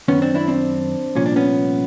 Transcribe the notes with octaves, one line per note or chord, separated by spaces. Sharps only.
F#2 D#3 B3 C#4
C4 D4
D4 E4
C4 D4
C2 A#2 F3 C#4
D4
B3 C#4